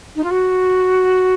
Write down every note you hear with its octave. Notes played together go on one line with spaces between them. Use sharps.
D#4
F4
F#4